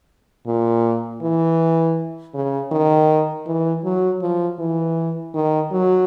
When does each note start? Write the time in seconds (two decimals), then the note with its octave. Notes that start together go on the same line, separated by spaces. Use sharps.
0.47 A#2
1.22 E3
2.34 C#3
2.72 D#3
3.47 E3
3.84 F#3
4.22 F3
4.59 E3
5.35 D#3
5.72 F#3